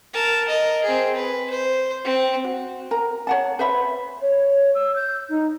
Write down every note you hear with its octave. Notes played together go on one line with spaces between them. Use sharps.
A#4 A5
A#4 D#5
C4 G#4
B4
C5
C4
F#4
A#4 A#5
C#5 F#5 A5
B4 C5 E5 B5
C#5
E6
G6
D#4